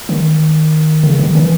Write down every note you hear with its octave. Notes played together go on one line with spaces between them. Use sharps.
D#3
C#3
D#3
E3